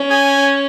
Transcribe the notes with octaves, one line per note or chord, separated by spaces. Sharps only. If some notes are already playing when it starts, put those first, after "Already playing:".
Already playing: C#4
G#5